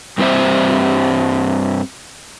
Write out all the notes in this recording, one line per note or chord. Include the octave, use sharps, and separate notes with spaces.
G2 G3 C4 C5 E5